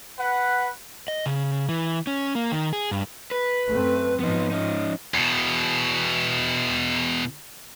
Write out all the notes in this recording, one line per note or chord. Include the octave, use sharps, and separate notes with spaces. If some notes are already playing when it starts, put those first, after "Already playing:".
B4 F#5
D#5
C#3
E3
C#4
A#3
D#3
G#4
G2
B4
F#2 A3 C4
G#2 F3 B3 D#4
C#4 D#4
E2 B2